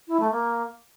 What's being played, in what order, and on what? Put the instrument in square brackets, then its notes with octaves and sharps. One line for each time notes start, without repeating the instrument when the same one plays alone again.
[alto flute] E4
A3
A#3